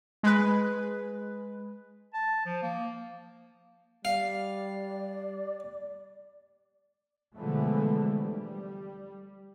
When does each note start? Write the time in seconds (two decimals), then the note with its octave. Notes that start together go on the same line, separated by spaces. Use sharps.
0.23 G#3 B4
2.14 A5
2.46 F3
2.63 A#3
4.05 G3 D5 F5
7.36 B2 D3 E3 F3 G#3 A3
8.18 G3